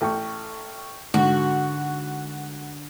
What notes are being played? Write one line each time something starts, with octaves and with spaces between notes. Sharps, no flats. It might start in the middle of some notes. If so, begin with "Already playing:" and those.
A1 A4 G5 C#6
G#2 D3 F#4